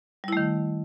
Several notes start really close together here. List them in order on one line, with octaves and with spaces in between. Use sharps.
G3 E4 A3 D#3